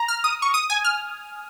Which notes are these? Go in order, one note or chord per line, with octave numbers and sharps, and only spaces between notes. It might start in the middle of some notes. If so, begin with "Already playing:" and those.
Already playing: A#5
F6
D#6
C#6
D#6
G#5
F6